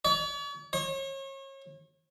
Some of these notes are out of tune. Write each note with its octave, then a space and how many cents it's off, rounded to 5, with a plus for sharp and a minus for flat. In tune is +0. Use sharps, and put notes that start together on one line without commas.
C#5 +45
C#5 -35